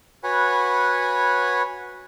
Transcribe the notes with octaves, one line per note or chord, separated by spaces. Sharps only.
F#4 B4 C#5 F#5 G#5 B5